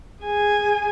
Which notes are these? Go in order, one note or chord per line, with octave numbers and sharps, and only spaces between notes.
G#4 G#5